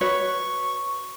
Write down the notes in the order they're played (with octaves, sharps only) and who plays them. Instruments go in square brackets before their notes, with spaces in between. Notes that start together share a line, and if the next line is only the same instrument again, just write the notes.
[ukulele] F#4 B4 C#5 [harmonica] C#6